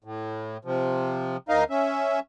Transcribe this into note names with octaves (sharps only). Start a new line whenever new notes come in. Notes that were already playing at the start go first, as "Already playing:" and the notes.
A2
C3 F3
D2 D#4 A#4 D#5 F5
C#4 E5